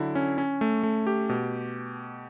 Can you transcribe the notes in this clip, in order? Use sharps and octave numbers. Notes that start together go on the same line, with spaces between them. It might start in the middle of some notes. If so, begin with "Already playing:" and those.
Already playing: D3 F#3 E4
C#4
C#4
A3
A3
G4
B2